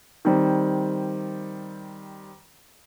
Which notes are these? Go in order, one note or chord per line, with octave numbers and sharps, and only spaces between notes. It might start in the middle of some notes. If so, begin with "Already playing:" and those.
D#3 G3 C4